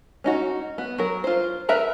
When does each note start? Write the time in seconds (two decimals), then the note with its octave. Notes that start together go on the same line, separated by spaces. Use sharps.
0.24 C#4 D#4 F#4
0.78 B3
0.98 F#3 A#4
1.24 F4 C5
1.69 A#4 B4 E5 A#5 B5